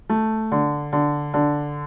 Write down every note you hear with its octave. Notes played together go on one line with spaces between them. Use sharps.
A3
D3
D3
D3